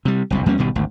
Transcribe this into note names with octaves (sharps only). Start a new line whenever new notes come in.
C3 G3
F#1 C2 B2
E2 G3 A#3 C#4
G#1 B2 D#3 G3
G#1 D2